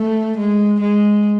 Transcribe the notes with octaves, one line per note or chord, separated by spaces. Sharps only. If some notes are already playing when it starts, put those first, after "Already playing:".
Already playing: A3
G#3
G#3